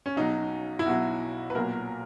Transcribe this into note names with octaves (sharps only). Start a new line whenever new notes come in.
C#4
B1 B2 F#3 D#4
E4
B1 B2 F#3 F#4
B4
B1 A#2 F#3 A#4